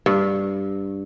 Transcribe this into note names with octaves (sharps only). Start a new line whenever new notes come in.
G2